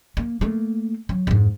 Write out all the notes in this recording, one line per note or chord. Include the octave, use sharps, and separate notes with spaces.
A#3
A3 A#3
F#3
F2 G#2